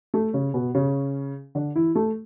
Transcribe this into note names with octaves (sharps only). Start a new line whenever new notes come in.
A3 A4
C#3 C#4
B2 B3
C#3 C#4
D3 D4
E3 E4
A3 A4